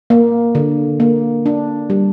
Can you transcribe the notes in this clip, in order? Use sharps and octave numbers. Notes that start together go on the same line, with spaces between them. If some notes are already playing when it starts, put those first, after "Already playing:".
A#3
D3
A#3
D4
G3